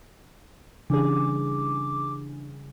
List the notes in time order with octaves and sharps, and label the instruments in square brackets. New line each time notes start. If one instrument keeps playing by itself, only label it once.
[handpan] C#3 [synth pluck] E3 G3 G#4 [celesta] D4 [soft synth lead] D6